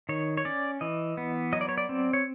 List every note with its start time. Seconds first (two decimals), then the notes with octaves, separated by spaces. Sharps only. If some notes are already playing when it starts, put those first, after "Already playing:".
0.09 D#3 C#5
0.37 C#5
0.45 C#4 D5
0.81 E3 D#5
1.17 B3
1.53 F#3 D#5
1.61 D5
1.69 C#5
1.78 D5
1.89 C4
2.13 C#5